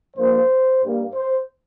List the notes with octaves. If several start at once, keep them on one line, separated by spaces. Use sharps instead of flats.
G2 F3 A#3 C5
G2 G3 A#3
C5